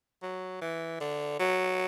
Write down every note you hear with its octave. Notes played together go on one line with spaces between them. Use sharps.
F#3
E3
D3
F#3